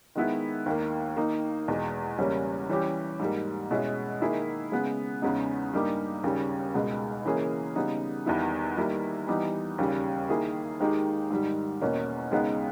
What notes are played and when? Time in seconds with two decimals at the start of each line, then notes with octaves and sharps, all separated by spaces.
0.16 D#3 G#3 B3 E4
0.66 D#2 D#3 A#3
1.17 D#3 A#3 D#4
1.68 E2 B2 G#3
2.18 E2 C#3 G3 A#3 C#4
2.69 E3 G3 C#4 G4
3.20 G#2 G3 A#3
3.71 B2 G#3 C#4 E4
4.21 D#3 A#3 E4 G#4
4.72 C#3 G#3 B3
5.22 E2 C#3 G#3 B3 D#4
5.73 G2 G3 A#3 D#4 G4
6.24 D#2 C#3 G3
6.75 C#2 B2 G#3
7.25 C#3 E3 A#3 C#4 G#4
7.76 C#3 G3 B3 D#4
8.26 E2 D#3 G3 B3 E4
8.77 D#3 G3 A#3 E4
9.27 E3 G3 B3 D#4 G4
9.78 D#2 C#3 G3
10.29 D#3 A#3 E4 G#4
10.80 D#2 D#3 G#3 D#4 G4
11.31 G#2 D#3 G3
11.81 E2 B2 A#3 C#4
12.31 D#2 C#3 G#3 B3 D#4